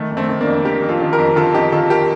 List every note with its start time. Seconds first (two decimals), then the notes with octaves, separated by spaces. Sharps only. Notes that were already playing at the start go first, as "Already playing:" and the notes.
Already playing: D#3 A3
0.11 F2
0.17 A3 C4
0.29 D#3
0.41 A#3 D4
0.47 F2
0.65 D#3 G4 A#4
0.83 F2
0.89 F4 A4
1.01 D#3
1.13 G4 A#4
1.19 F2
1.36 D#3 F4 A4
1.54 F2 D#4 G4
1.72 D#3 F4 A4
1.90 G4 A#4